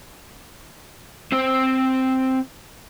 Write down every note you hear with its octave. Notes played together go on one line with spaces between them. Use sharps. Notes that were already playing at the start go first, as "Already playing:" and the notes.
C4 C5